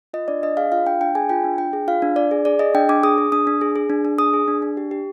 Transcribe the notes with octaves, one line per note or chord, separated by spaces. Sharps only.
F4 D#5
D4 D5
D4 D#5
G#4 F5
F4 F5
D4 G5
D4 G5
G#4 G#5
F4 G5
D4
D4 G5
G#4
F4 F5
D4
D4 D5
G#4
G#4 D5
G#4 D#5
D4 G5
D4 D6
G#4 D#6
G#4
D4 D#6
D4
G#4
G#4
D4
D4
G#4 D#6
G#4
D4
D4
G4
G4